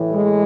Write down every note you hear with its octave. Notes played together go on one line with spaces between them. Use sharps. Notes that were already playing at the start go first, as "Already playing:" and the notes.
Already playing: A2 E3
G#3